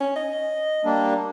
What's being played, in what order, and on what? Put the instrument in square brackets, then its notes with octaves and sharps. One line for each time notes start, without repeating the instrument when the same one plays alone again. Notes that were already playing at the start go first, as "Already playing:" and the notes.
[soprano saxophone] C#4
D#5
[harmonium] G3 A#3 D4